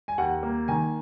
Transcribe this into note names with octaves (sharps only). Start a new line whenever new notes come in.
G#5
D#2 F#5
A#3
D#3 G#5